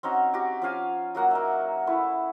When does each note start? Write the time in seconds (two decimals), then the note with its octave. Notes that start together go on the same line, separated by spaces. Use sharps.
0.03 C4 C#4 D#4 F#4
0.34 F#4 G4
0.62 F3 C#4 F5 G#5
1.15 F#3 A#3 F#5
1.31 A#3 D#4 E5
1.87 A3 E4 B4 C#5